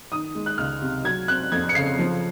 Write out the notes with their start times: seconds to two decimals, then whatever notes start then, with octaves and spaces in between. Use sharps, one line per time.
0.12 D#3 D#6
0.35 G#3
0.46 F#6
0.58 C#2 F6
0.82 C3
1.04 F#3 G#6
1.28 C4 F#6
1.52 F2 G#6
1.69 C#7
1.75 C#3 C7
1.99 F3